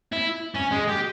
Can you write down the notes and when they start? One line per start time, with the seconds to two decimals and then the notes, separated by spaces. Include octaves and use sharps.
0.13 E4
0.56 C#4
0.72 G#3
0.89 G4